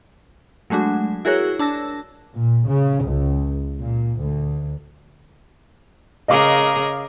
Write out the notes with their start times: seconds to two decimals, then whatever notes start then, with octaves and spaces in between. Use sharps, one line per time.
0.70 F#3 G#3 A3 D4 F#4
1.25 E4 F#4 G#4 A#4 C#5 F#6
1.59 D4 A5 E6 A#6
2.35 A#2
2.66 C#3
3.04 C#2
3.79 A#2
4.19 D2
6.28 C#3 G#4 A#4 D#5 F5 D6